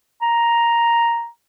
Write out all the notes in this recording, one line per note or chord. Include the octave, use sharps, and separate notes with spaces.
A#5